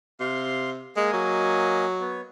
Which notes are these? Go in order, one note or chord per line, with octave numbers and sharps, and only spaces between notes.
C3 F5 C6
G#3 A#3 D#5 G#5
F#3
B3 C#5